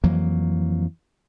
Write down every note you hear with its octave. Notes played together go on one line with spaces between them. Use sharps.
F2 E3 F#3 A#3